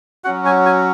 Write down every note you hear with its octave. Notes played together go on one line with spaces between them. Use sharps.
F#3 C#4 F#4 F#5
G#5
G#5